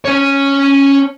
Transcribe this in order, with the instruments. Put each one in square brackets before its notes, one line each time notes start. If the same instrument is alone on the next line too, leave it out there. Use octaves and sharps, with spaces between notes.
[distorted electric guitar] C#4 C#5